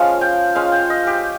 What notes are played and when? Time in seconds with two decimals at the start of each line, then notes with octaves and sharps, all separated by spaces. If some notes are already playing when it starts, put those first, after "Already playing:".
Already playing: F3 G#3 C#4 F5
0.21 G5
0.55 G#3 C#4 F4 F5
0.72 G5
0.90 D#5
1.07 G4